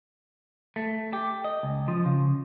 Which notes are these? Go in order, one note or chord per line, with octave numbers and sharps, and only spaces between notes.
A3
G4
D#5
C#2
F3
C#3